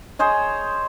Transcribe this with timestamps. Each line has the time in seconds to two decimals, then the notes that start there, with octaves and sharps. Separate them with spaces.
0.19 G#4 C5 C#5 D#5